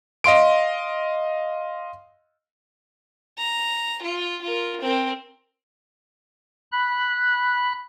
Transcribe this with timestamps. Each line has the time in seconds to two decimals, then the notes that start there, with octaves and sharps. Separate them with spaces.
0.24 D#5 F5 C6 D7
3.38 A#5
4.02 F4
4.42 F4 A#4
4.81 C4 A#4
6.72 B5 F#6